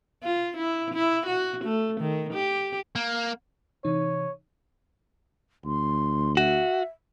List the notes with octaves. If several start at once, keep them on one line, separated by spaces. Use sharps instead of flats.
F4
E4
E4
F#4
A3
D#3
G4
A#3
C3 E3 D#4 C#5
D2 C6
F#4 E5